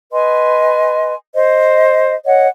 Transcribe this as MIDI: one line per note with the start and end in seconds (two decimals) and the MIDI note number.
0.12 1.14 71
0.12 1.14 75
0.12 1.14 80
0.12 1.14 84
1.34 2.15 72
1.34 2.15 75
2.26 2.47 73
2.26 2.47 75
2.26 2.47 78